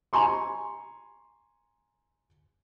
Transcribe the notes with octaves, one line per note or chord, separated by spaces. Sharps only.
G#5 A#5 C6 C#6